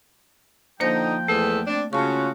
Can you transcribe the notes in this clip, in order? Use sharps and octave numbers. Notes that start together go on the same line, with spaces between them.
D3 F3 A#3 D#4 C5 G5 A#6
E2 A3 B3 A4
C4 D4
C#3 F4 F#4 A5 C#6